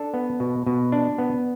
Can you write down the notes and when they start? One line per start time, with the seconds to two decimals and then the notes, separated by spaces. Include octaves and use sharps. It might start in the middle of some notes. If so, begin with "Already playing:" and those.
Already playing: D4 A4
0.14 B3
0.40 B2
0.66 B2
0.92 D4
1.18 B3